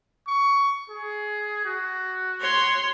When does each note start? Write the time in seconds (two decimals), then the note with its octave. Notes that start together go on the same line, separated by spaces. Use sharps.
0.27 C#6
0.90 G#4
1.65 F#4
2.40 C#5 C6